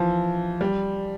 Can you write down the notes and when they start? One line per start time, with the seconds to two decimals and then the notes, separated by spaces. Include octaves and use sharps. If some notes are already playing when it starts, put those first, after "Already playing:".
Already playing: E3 F3
0.61 G3